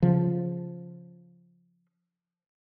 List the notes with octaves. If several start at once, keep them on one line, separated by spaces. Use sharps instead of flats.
C#3 F3